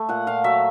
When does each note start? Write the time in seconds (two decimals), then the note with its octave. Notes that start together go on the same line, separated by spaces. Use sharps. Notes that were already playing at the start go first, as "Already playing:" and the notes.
Already playing: A3
0.09 A#2 F#5
0.27 A#2 F5
0.44 F#3 E5